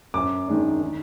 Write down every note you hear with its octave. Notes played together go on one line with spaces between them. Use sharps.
F#2 D6
D#3 G#3 D4
D#3